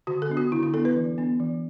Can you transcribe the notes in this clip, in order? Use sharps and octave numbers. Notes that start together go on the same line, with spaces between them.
D3 F#4
A4
B3 D4
F#4
D3 E4
E4
B3 D4 A4
B4
E3
B3 D4
E3